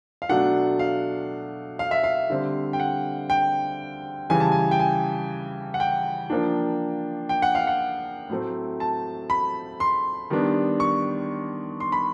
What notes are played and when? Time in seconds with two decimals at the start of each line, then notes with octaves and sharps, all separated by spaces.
0.22 F5
0.29 B2 F#3 A3 D4 F#5
0.79 F5
1.79 F5
1.91 E5
2.04 F5
2.30 D3 G3 C4
2.73 G5
2.80 F#5
3.30 G5
4.30 C#3 E3 G3 G#5
4.40 A5
4.52 G#5
4.71 G5
4.79 G#5
5.74 F#5
5.80 G5
6.30 F3 A#3 D4
7.29 G5
7.42 F#5
7.55 F5
7.67 F#5
8.29 A2 F#3 A3 C4
8.80 A5
9.30 B5
9.80 C6
10.30 D#3 G3 B3 D4
10.80 C#6
11.80 C6
11.92 B5